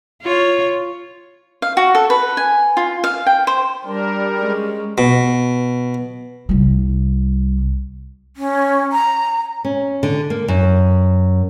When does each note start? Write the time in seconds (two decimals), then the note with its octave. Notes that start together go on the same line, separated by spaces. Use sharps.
0.22 F4 C#5
1.62 F5
1.77 F#4
1.95 A4
2.10 B4
2.37 G#5
2.77 F4
3.04 F5
3.26 G5
3.47 C5
3.85 G3 D4 A#4
4.39 G#3 C#4
4.98 B2
6.49 C2 G3
8.36 C#4
8.93 A#5
9.65 C#4
10.03 D3
10.30 A#3
10.48 F#2